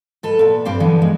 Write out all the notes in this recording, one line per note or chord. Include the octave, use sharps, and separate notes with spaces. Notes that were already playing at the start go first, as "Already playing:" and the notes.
G#2 A4 B4
A#2 B4
G2 C4 G4 F5
D3 E3 F3 B3
G#3